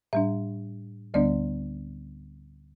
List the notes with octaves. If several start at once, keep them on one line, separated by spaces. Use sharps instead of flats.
A2 G3 D4 E5
D2 D3 G3 B3 D4 D5